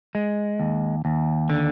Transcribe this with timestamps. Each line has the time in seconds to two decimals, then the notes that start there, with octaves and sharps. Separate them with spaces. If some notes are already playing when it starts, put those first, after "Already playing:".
0.15 G#3
0.60 D#2
1.05 D#2
1.50 D3